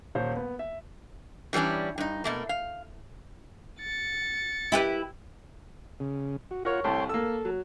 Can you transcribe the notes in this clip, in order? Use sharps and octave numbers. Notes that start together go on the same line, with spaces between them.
D#1 C5 C#5
B3
E5
E3 G3 A3 C#4 D4
G2 D#4
B2 A3 A#3
F5
A6 C#7
E4 G4 B4
C#3
F#4
F4 A#4 C#5 F#5
C2 A2 A3 C#5 G5 C6
A#3 A4 E6
F#3